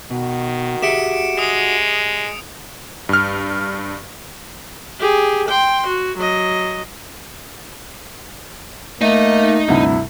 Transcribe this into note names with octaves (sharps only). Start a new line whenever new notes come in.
B2 D#3 F#4
G4 G#4 E5 C#7 D7 E7
G#3 D#6
G2 F6
G4 G#4
G5 C6
F#4
F#3 D#5
A3 A#3 D#4 D#5
D2 G2 C3 E4